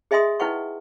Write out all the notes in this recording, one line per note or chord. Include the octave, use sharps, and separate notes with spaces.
G#4 D#5 E5 G#5 C6 D#6
D#4 E4 B4 F#5 G5 C#6